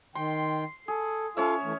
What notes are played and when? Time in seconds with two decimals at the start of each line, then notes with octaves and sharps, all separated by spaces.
0.15 D#3 G5 C6
0.88 G#4 A4
1.37 C#4 F4 A4 C#5 E5 F5
1.64 E3 A3